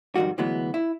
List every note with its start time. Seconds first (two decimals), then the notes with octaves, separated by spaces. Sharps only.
0.16 F2 G#2 D#3 G3 F#4
0.38 D2 E3 F#3 G#3 B3
0.74 E4